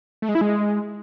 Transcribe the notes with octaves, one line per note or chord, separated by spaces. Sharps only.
A3
G#3
E4
G#3